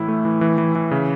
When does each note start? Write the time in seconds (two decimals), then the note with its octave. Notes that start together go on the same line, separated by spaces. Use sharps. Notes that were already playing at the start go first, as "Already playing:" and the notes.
Already playing: A2 E3 E4
0.08 A3
0.25 E3
0.41 E3
0.58 E3
0.75 E3
0.91 C#3